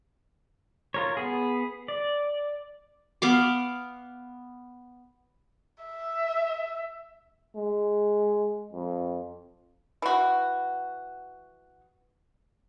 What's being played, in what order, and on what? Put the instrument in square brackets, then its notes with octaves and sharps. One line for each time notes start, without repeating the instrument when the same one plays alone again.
[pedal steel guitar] F4 A#4 C#5
B3 G#4
D5
[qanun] B3 F5 D6
[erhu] E5
[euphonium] G#3
F2
[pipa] E3 F#4